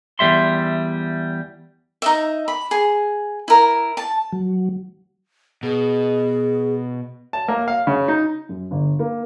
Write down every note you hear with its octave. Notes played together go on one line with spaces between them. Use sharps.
E2 F3 G3 E5 C6
D#4 D#5 E5
B5
G#4
E4 A#4
A5
F#3
B2 G#4
A5
A#3
F5
C#3
D#4
F#2
G1
A#3